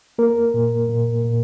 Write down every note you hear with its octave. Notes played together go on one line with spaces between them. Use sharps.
A#3 A#4
A#2
A#2
A#2